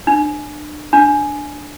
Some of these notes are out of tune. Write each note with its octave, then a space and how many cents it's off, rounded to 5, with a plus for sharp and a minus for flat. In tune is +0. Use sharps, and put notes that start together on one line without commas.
D4 +30
D4 +5